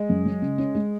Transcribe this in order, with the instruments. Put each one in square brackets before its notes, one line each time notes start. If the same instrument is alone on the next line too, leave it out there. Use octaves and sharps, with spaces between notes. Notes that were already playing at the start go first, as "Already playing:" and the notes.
Already playing: [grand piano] G#3
[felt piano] F#2
F#3
C#3
C#4
G#3